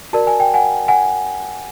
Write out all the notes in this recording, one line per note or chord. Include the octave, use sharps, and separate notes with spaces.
F#4 A#4 D5 A5
G#5
G5
F#5 G#5
F#5 G#5